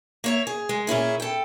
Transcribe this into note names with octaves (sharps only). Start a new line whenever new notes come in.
A#3 C#5 E5
G#4
G#3
A#2 C#4 E4 G#4
A4 G5